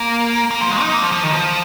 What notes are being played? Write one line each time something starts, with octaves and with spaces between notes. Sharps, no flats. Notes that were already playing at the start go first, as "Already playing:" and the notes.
Already playing: A#3
A#3
F3
G#3
D#4
A#3
F3
F3
D#3
F3